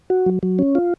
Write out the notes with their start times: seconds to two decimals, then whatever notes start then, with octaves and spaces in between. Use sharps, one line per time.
0.10 F#4
0.26 F#3
0.43 F#3
0.59 C#4
0.75 F4